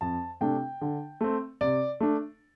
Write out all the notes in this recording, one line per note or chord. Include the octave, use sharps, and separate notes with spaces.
F2 A5
C3 A3 D4 G5
D3
A3 C4
C3 D5
A3 D4